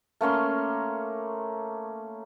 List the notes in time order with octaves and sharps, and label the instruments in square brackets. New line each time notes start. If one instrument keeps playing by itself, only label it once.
[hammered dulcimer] A3 A#3 C#4 C6